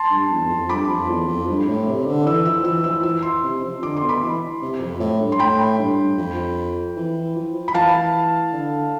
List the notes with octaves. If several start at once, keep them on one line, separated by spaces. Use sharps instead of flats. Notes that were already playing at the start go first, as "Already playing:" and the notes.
Already playing: A5 C6
G2
E2
E2
F2
G2 B5 D6
F2
E2
F2
G2
A2
C3
D3
E3 E6
F3 E6
E3 E6
F3 E6
E3 E6
C6 E6
C3
F3
D3 D6
C6
B2
B5 D6
E3
C3
F2
A2
G2
C6
A2 G5 B5
G2
F2
E3
F3
F3 B5
E3 F5 A5
D3